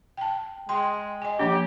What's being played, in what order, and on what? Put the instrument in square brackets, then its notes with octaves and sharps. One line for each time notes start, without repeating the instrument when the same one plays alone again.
[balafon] G5 A5
[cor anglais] G#3 [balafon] G5 C6
[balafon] D#5 G#5
[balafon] F3 A#3 D4 [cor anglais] G4